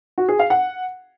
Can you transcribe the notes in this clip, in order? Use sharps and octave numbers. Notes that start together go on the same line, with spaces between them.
F#4
G#4
F5
F#5